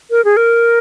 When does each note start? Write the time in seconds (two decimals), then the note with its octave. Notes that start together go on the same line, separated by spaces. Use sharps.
0.11 A#4
0.25 G#4
0.37 A#4